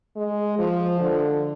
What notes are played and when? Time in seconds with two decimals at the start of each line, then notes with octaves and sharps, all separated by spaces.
0.17 G#3
0.59 F3
1.00 D3